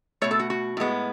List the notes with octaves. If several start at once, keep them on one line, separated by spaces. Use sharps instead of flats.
B2 A3 C#5
A4
F#4
F#4
A2 G#3 B3